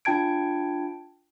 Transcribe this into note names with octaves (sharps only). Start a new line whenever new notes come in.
D4 F4 G5 A5 G#6 D7